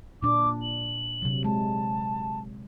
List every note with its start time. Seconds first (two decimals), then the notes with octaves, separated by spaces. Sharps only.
0.23 A#2 D4 D6
0.62 F#7
1.22 C3 F#3
1.44 G#3 A5